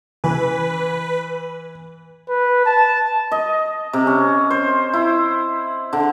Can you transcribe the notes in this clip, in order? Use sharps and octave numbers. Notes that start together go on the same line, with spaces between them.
E3 B4
B4
A5
D#5
C3
C#4
C5
E4
D3